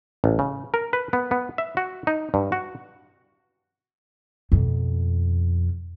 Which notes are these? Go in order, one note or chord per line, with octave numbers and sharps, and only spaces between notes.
A1
C#3
A#4
B4
B3
B3
E5
F#4
D#4
G2
F#4
F2 B2